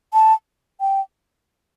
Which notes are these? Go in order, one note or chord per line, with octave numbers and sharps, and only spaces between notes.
A5
G5